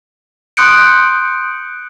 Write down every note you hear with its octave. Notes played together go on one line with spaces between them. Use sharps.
C6 D#6 F#6 G6 C#7 D7